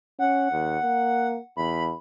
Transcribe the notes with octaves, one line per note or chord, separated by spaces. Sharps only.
C#4 F#5
D#2
A#3
E2 B5